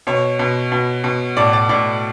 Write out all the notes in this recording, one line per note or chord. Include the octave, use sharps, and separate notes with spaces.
B2 C#5
B2
B2
B2
A2 D5
D5
A2 D5